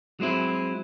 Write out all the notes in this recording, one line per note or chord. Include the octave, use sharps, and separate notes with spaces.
F#3 G#3 C4 E4